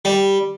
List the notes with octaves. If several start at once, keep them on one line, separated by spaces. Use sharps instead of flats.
G3